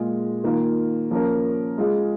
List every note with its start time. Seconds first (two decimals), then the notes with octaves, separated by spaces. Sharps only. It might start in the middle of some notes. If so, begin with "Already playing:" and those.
Already playing: A#2 G#3 F4 G#4
0.44 D#3 A#3 F4
1.11 F3 A#3 C#4 A#4
1.78 G#3 F4 G#4